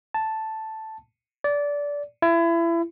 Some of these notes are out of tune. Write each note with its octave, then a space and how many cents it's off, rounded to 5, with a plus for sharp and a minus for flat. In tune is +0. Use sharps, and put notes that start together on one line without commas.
A5 +0
D5 -20
E4 +30